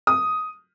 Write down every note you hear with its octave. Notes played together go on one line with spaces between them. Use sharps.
D#6